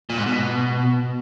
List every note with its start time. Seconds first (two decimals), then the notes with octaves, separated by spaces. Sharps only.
0.10 A#2
0.18 G#2
0.26 B2